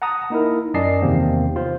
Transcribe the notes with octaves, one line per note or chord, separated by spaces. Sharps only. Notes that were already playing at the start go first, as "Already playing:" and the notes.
F#5 A5 A#5 D#6
A#3 D#4 E4 A#4
F#2 D5 D#5 G#5 A5 C7
E2 C3 D#3 A#3 C4
F4 C5